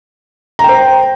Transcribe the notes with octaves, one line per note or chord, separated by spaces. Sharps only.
C5 G5 A#5